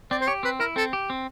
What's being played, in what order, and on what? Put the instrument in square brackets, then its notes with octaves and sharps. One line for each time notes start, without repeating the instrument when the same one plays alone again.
[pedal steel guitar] C4 [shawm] D5
[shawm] C5
[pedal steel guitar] G4 [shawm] C#5
[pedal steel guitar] C4 [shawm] B4
[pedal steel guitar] E4 [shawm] A#4
[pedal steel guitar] C4 [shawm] A4
[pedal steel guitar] G4
C4